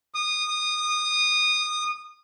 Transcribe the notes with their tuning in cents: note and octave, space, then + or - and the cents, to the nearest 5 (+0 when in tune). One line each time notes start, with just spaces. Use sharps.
D#6 -20